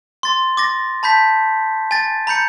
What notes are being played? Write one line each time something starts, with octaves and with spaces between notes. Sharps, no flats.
C6 A6
D6 A6 A#6
A5 B5 G6 B6
G#5 A6
A#5 B5 G6 C#7